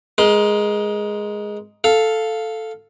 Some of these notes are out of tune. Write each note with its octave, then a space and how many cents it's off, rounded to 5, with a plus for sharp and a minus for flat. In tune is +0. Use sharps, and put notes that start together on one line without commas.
G#3 +0 A#4 +30 C6 -15
A4 +0 F5 +0